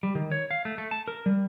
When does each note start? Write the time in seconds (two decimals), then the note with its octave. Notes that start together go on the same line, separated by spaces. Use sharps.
0.03 G3
0.15 D#3
0.32 C#5
0.51 F5
0.65 A3
0.78 A3
0.91 A5
1.08 A#4
1.26 G3